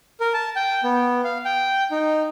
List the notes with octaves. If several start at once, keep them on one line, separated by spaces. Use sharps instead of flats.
A#4
A5
G5
B3
F5
G5
D#4